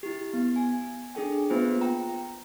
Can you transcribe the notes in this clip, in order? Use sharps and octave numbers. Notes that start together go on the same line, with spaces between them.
E4 G4
B3
G#5
D4 G#4 A4 G5
A#3 B3 F4 B4 C5
G5 A#5